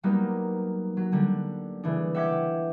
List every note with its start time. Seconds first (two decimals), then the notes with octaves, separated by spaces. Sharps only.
0.03 F#3 G3 A#3 B3 D#4
0.97 F#3
1.12 D3 G3 D4
1.84 C#3 E3 D4
2.15 E5 F#5 G5 D6 G#6 B6